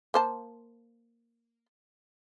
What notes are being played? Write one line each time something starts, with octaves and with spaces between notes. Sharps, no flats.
A#3 C5 A5